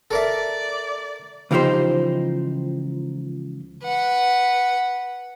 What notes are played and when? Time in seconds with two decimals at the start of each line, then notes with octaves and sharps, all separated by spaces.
0.11 A4 A#4 D5 E5
1.51 C#2 E3 F3 D#4 G4 C5
3.84 B4 F#5